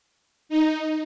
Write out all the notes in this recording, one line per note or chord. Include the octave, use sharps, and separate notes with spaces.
D#4